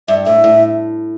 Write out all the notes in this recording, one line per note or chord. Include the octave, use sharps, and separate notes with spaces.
G2 E5
A2 E5
A2